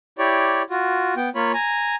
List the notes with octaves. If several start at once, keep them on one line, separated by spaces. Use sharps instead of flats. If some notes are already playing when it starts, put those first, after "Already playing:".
E4 G4 C#5 D5
F4 F#4
B3 G5
A#3 F4 C#5 B5
G#5 A#5